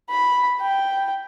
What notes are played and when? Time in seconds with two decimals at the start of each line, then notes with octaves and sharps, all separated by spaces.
0.11 B5
0.61 G5